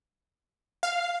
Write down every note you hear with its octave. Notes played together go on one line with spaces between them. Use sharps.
F5